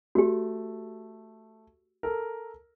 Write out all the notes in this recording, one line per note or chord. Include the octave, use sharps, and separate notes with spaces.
A3 F#4 G4
A4 A#4